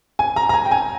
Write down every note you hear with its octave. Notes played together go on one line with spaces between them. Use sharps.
G#5
A#5
A#5
G#5
G5
G#5